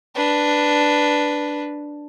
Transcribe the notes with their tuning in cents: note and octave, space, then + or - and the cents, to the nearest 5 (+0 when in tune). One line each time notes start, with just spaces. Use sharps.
D4 +0 B4 +0